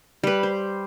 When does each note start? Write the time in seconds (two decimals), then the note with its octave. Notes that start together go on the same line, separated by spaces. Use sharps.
0.23 G3 B4
0.43 C5